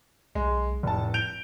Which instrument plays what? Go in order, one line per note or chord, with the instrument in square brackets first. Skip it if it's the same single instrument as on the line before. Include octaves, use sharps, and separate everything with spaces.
[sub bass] B1 [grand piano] G#3
[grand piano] F1 A5 [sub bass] A2
[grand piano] G6 D7 F7